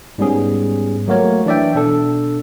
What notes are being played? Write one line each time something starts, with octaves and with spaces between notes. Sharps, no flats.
G#2 G3 B3 C#4 G#4
F#3 A3 A#3 F#4 A#4 C#5
E3 D4 D5 E5 G5
B2 D4 A4